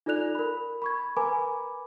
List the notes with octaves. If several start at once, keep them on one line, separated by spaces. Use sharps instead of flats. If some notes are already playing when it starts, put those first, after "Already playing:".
D#4 F4 A4 D5 F#6 F7
A#4 B5
B5 C#6 G#6
A#4 B4 G#5 A#5 B5 D6